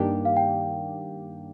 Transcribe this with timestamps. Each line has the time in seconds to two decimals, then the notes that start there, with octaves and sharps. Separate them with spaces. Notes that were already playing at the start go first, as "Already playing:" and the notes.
Already playing: G2 D#3 A#3 D4 G4 G5
0.25 F5
0.37 G5